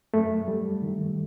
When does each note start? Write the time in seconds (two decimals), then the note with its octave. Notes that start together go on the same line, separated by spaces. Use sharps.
0.14 F#2 A3
0.48 G3
0.82 D#3